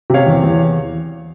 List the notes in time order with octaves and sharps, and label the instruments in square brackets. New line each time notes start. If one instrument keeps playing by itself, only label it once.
[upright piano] C3 C#5 F5
E2
E2